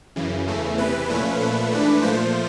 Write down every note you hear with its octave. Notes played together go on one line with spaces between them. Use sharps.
F#2 C#3 E3
E2 C#3 E3 A3
E2 C3 E3 B4
A#2 F3 A3 C#4
A#2 F3 A3
G#2 E3 A3 D4
A#2 F3 A3 C5